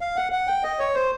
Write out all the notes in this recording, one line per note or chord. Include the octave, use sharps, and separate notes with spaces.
F5
F#5
F#5
G5
D#5
C#5
C5